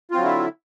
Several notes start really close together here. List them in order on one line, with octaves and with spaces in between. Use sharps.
F4 C4 F#3 D3 E4